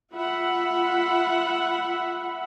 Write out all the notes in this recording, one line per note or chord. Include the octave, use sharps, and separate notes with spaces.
F4 E5 F#5 B5